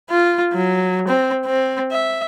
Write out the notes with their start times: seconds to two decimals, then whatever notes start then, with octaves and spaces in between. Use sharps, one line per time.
0.11 F4
0.53 F#3
1.08 C4
1.46 C4
1.92 E5